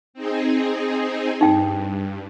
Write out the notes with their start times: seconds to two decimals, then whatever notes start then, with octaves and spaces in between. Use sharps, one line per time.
0.14 C4 D#4 G#4
1.41 G2 D#4 G5